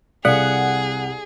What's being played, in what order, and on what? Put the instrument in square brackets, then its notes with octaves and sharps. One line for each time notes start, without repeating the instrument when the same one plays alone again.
[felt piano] C2 [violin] G#4 [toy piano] A4 D5 F5 [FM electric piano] F#5